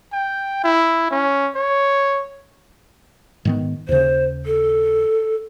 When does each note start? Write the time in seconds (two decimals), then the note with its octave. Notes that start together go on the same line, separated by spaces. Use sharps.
0.13 G5
0.64 E4
1.11 C#4
1.56 C#5
3.45 G#2 D#3 B3
3.89 D#2 C#3 C5
4.46 A4